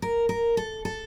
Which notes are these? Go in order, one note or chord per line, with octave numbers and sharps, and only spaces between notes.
A#4
A#4
A4
A4